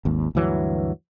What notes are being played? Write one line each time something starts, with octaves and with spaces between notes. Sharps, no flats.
G#1 D#2
D2 G2 E3 F#3